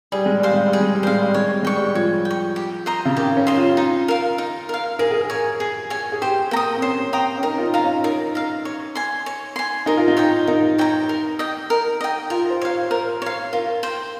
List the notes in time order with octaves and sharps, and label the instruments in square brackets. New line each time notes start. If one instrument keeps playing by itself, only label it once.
[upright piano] G3 [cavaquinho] G#4
[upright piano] G#3
[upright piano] G3 [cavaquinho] C5 F5
[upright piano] G#3
G3
[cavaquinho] G#4
[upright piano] G#3
G3
[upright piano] G#3 [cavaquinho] C5 F5
[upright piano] G3
[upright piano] G#3 [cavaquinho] C#5
[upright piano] G3
[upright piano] G#3 [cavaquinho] G5 C#6
[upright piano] G3
[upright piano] F3 [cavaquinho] C#5
[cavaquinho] G5
C#6
G4
C5 D#5 A#5
[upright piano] C#3
[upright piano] D#3 [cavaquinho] G4
[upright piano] C#4
[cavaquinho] C5 D#5 A#5
[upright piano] F4
[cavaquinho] D#4
A#4 F5
D#4
A#4 F5
[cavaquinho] G#4 [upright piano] A#4
[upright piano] G#4
A#4
[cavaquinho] C#5 G#5
G#4
C#5 G#5
[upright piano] G#4
[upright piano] G4 [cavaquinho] C5
[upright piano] A#3 [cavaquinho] G5 A#5
[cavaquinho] D#6
[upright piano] C4
[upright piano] C#4 [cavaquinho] C5
[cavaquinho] G5 A#5 D#6
[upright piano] C#4
[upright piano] D#4 [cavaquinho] A#4
[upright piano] F4
D#4
[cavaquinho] F5 A#5
[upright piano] C#4
[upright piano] D#4 [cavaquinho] A#4
[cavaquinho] F5 A#5
C#5
G#5 C6
C#5
G#5 C6
[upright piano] D#4 [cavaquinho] A#4
[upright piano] F4
D#4
[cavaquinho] C#5 G5 A#5
[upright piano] D#4 [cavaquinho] A#4
[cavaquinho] C#5 G5 A#5
A#4
D#5 G5
A#4
D#5 G5
[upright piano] F4 [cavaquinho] A#4
[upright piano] C5
[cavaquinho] C#5 F5
[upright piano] C5
[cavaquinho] A#4 [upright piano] C5
[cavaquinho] C#5 F5
[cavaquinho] F4 [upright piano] A#4
[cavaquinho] C5 G5